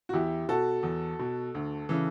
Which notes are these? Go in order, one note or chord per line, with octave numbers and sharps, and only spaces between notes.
F#4
E2 E4 G4
B2 F#4 A4
E2
B2
D2
C#3 E3